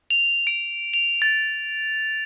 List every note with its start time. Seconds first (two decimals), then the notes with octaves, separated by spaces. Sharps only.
0.10 F7
0.47 D7
0.94 F7
1.22 A6